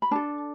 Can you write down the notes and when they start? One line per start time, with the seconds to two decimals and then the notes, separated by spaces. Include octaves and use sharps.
0.02 B5
0.11 D4 A4 A5